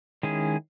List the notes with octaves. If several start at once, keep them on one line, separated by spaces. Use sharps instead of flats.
D#3 G#3 C#4 E4 G#4